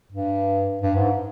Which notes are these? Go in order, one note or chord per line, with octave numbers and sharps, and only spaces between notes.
G2
G2
G#2